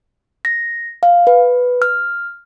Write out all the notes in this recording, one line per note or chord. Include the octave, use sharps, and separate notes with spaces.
A#6
F5
B4
F6